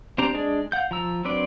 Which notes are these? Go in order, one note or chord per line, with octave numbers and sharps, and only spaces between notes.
C4 D4 G4 C5 A#5
G#3 D4 G#4 D5
F5 F#5 G6
F3 A#5 E6
F#3 C4 D4 B4 D5